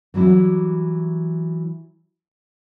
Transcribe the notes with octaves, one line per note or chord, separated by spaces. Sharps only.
E3 F#3 G3 E4